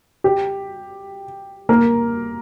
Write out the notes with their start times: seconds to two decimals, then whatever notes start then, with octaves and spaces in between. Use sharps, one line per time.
0.24 G4
1.69 A#3 A#4